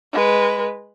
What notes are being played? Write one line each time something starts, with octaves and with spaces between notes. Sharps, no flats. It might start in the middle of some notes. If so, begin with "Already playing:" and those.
G#3 B4